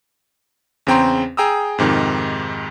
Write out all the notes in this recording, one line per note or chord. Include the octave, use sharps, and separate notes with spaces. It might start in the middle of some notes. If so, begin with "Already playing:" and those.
E2 C#3 C4 G5 A#5 C6
G#4 G5 A#5 D#6 E6
F2 G#2 C3 D#3